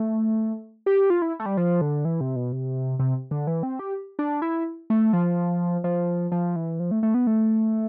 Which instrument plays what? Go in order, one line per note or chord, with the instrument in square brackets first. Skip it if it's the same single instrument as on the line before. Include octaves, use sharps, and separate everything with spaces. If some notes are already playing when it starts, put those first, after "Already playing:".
Already playing: [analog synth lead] A3
G4
F4
E4
A3
G3
F3
D3
E3
C3
B2
C3
C3
D3
E3
C4
G4
D4
E4
A3
F3
F3
F3
E3
F3
A3
A3
B3
A3